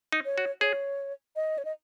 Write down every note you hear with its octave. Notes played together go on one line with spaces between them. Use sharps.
D#4
C#5
F#4
G#4 C#5
D#5
C#5
D#5